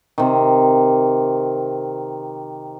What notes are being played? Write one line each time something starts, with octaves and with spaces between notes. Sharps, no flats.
C3 D#3